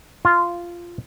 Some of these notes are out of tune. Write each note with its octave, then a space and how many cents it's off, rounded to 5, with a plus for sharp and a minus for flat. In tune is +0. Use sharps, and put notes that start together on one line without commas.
F4 -10